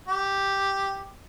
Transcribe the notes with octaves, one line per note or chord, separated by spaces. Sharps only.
G4